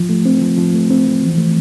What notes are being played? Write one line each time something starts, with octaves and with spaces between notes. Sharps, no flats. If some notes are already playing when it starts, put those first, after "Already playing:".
Already playing: F3
A3
C4
F3
F3
A3
C4
F3
E3
A3